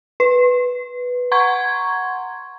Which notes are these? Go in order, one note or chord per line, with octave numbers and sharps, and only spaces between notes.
B4
F#5 A#5 C6 C#6 G#6